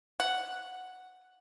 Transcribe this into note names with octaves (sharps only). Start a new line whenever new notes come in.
F#5